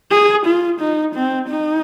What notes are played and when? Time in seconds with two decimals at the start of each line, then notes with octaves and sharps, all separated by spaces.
0.11 G#4
0.46 F4
0.80 D#4
1.15 C4
1.48 D#4